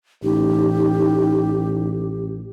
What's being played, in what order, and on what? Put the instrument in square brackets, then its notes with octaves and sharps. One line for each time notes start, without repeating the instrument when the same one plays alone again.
[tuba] A1 [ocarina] D#4 [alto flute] G4